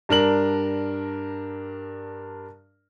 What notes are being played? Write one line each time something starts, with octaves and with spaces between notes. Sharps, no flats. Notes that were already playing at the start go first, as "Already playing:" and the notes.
G2 D4 A#4 F#7